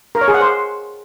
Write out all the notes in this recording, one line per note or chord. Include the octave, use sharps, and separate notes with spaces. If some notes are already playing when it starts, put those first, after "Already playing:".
A#4
C#5
G#4
F#5
C5